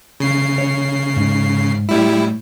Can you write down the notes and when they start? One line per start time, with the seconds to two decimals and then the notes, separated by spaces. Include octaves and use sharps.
0.20 C#3 C7
0.58 C#5
1.16 G#2
1.89 A2 G3 E4